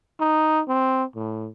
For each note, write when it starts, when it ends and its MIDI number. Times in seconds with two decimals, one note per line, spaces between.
0.21 0.61 63
0.68 1.04 60
1.15 1.49 45